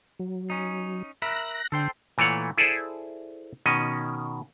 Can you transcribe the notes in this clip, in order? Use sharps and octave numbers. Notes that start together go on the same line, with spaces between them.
F#3
C#4 D#4
A#4 E5 B5 F#6 A#6
D3 A4 C5 G5
A#2 E3 A3 C#5 F#5
E4 G#4 A4 C5 D5
B2 D#3 C#4 D#5